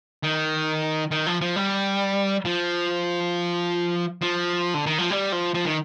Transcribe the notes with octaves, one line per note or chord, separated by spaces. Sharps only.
D#3
D#3
F3
F3
G3
F3
F3
D3
D#3
F3
G3
F3
F3
D#3